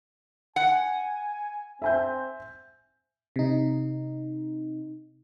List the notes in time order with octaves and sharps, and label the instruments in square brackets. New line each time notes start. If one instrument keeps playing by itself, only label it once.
[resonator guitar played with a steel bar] F#5 [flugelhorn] G#5
[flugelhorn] C4 [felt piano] E5 G#5 G6
[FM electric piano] C3 D#4